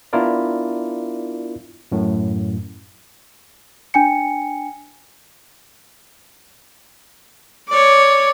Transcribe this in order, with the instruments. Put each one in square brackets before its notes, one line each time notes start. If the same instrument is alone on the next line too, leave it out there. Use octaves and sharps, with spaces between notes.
[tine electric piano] B3 D4 E4 F4 A#4 D5
F#2 A2
[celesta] D4 G5 G#5 C#7
[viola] C#5 D5